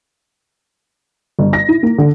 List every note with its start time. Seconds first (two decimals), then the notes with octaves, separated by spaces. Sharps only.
1.39 G1
1.53 A#6
1.68 E4
1.83 A#3
1.98 D3